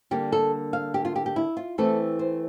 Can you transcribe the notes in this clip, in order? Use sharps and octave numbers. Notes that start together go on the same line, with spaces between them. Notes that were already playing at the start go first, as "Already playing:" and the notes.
D3 G3 A#3 G4
A4
F5
G4
F4
G4
G4
E4
F4
E3 A3 C4 E4 A4
C5